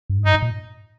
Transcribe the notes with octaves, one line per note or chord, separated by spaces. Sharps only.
G2
G#2
G2 D#4
G#2
A#2